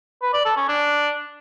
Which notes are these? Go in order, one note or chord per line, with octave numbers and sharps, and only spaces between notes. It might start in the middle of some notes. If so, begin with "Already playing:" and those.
B4
D5
A4
C#4
D4